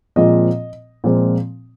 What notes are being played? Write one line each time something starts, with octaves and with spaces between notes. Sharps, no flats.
A#2 F3 G#3 C4 D#5
A#2 F3 G#3 C4